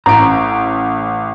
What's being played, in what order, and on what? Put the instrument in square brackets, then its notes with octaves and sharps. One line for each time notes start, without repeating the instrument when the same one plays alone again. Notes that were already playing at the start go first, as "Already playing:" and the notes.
[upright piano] A1 D7 [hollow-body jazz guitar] A#5